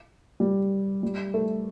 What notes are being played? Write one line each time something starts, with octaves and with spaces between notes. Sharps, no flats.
G3
G3
A3